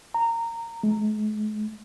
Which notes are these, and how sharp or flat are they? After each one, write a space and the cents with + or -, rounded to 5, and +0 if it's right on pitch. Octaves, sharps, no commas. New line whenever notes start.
A#5 -20
G#3 +45